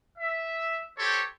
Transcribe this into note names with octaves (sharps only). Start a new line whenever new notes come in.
E5
G4 A4 C5 C#5